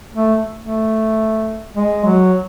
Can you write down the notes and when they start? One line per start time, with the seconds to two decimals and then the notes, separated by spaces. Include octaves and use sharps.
0.14 A3
0.59 A3
1.75 G#3
2.05 F#3